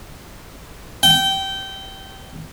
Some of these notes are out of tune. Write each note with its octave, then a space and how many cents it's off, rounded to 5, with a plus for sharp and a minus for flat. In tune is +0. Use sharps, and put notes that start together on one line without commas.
G5 -20